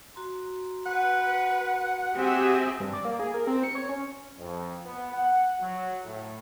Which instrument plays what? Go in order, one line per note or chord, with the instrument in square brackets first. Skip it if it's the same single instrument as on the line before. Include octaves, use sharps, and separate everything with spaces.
[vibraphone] F#4 A#5 C6
[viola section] B4 [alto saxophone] F#5
[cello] C4 G#4 [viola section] G4 E5
[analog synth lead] G2
D5
A#3
G#4
A#4
C4
C#7
C#5
C#4
[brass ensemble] F2
B3
F#5
F#3
A2